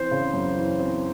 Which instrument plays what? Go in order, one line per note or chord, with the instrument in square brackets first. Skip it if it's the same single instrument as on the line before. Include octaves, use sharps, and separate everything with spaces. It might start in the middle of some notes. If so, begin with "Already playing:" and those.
Already playing: [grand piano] E3 C4 [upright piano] C5
[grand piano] C#3
F#2
E3
C4